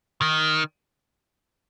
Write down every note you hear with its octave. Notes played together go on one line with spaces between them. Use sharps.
D#3